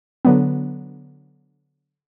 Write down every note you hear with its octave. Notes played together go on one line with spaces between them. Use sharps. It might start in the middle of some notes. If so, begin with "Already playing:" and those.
D3 F#3 B3